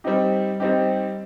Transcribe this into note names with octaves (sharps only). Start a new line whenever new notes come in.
G3 C4 D#4 G4
G3 C4 D#4 G4